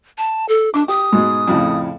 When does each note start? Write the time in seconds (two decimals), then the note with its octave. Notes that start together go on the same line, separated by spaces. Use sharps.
0.18 A5
0.49 A4
0.74 D4 D6
0.88 G4 D#6
1.12 G#2 B2 G#3
1.47 F2 A2 C#3